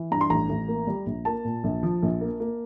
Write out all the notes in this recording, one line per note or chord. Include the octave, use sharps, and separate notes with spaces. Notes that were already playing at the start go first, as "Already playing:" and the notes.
Already playing: E3
G2 A#5
C6
A1 A#5
A1
A#3
G3
A#1
A#3 A5
A#2
A#1
F3
A#1
A#3
A#3